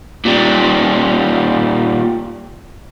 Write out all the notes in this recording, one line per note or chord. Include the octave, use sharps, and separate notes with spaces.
A#2 G3